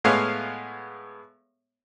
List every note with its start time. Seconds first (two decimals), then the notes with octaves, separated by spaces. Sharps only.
0.04 A2 G#3 B3 C#5 F5 G#5